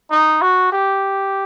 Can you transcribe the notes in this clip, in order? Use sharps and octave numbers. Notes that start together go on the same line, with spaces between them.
D#4
F#4
G4